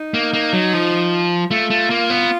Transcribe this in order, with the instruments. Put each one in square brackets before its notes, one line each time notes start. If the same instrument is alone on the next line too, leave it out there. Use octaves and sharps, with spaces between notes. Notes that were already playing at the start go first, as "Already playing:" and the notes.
Already playing: [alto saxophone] D#4
[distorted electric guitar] A#3
A#3
F#3
F3
[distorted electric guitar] A3 [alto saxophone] F4
[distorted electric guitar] A3
A#3
B3